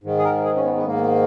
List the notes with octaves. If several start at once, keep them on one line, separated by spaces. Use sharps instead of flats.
G#2 D#3
G#4
A#4
G#4
C#4
B3
B3
G#2 D#3 A#3